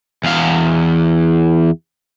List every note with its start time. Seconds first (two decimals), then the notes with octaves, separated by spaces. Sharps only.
0.24 E2 F5